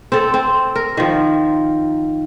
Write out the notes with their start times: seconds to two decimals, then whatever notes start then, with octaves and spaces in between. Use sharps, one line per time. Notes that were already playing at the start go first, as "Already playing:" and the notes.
0.12 C4 A4
0.34 C4
0.76 A#4
0.97 D#3 F3